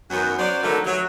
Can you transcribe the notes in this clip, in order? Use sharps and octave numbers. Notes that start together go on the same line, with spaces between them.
F#2 D#3 F#3 B3 F#4
F#3 C#4 C5 D5
D3 D#3 F#3 A3 A#4 B4
F#3